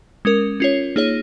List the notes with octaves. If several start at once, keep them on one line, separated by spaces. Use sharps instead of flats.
G#3 C#4 A#4
C#4 F4 C#5
A#3 D#4 G#4 C#5